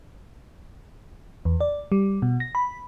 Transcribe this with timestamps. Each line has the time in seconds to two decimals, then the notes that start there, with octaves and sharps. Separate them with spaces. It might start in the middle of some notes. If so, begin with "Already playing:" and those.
1.45 E2
1.60 D5
1.92 G3
2.22 B2
2.40 A#6
2.55 B5